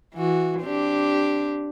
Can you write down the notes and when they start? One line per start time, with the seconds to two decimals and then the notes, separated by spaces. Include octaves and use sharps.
0.15 E3 F#4
0.60 C4 D4 G4